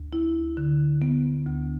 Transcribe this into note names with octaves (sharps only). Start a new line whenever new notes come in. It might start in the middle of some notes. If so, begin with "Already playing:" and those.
Already playing: D2
E4
D3
B3
D2